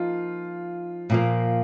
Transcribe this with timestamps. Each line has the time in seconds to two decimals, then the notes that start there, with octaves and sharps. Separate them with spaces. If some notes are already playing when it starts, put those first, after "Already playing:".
Already playing: F3 A#3 D#4 F4
1.10 A#2 F3 A#3